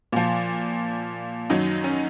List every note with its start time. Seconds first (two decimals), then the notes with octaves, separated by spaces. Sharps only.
0.12 A#2 F3
1.50 F#2 D#3 F#3 D#4
1.84 C#4